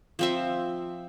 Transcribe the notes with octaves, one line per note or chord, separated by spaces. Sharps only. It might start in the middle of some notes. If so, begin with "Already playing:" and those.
F3 C4 E5